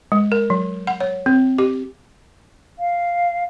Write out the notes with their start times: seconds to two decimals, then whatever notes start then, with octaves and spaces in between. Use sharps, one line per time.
0.12 G#3
0.32 A#4
0.50 F#3
0.87 F#5
1.00 C#5
1.26 C4
1.58 G4
2.79 F5